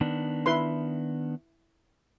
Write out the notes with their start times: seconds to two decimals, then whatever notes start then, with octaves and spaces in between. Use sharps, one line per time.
0.01 D#3 B3 D4
0.46 E4 B4 C6